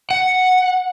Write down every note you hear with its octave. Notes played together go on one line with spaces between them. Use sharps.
F#5